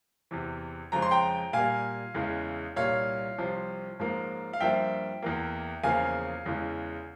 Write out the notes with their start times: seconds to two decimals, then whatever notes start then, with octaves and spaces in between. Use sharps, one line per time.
0.31 E2 C3 E3
0.92 F2 C#3 F3 G#3 A#5
1.02 C6
1.11 G5 A#5
1.53 A#2 G3 A#3 F5 G#5
2.14 E2 C#3 E3 G#3
2.76 C2 A#2 G3 A#3 C#5 F5
3.38 C2 C3 F3
3.99 G#2 F3 A#3
4.53 F5
4.60 G2 F3 A#3 E5 G5
5.22 E2 E3 A#3
5.83 E2 C#3 F3 A#3 F5 G#5
6.46 E2 C#3 E3 G#3